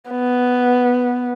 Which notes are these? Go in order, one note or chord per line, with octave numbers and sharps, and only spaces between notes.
B3